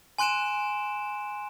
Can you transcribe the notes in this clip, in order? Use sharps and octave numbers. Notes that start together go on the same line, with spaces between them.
G#5 C6 F#6 D7 E7